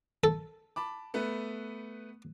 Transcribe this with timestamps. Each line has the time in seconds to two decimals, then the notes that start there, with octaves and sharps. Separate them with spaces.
0.24 A4
0.76 A5 B5 D6
1.14 A3 B3 B4